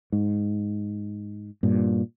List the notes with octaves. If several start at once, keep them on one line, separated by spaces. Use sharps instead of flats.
G#2
G2 A#2